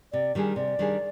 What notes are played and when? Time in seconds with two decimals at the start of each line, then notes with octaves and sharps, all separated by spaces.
0.12 C3 D5
0.35 D#3 G3 D4 G#4
0.56 C3 D5
0.79 D#3 G3 D4 G#4